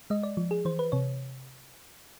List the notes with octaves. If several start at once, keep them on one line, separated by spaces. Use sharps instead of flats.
G#3 D#5
D5
F3
G#4
E3 C5
B4
C3 C#5